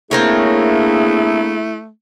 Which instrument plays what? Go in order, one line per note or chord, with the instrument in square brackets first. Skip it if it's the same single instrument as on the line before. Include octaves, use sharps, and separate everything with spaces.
[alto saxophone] A3 [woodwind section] A#3 D4 G#4 [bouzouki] C4 A#4 C#5 [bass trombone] E4